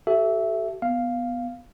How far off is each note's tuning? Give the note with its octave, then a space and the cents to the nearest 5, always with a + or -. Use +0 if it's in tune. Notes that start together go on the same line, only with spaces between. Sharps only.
F#4 +45 A4 -15 E5 +10
B3 +0 F5 +0